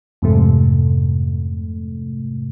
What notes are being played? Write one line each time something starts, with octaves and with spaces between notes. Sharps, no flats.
F2 G#2 C3 A3